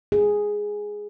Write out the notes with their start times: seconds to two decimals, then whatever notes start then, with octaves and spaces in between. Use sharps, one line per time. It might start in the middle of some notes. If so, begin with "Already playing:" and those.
0.12 G#4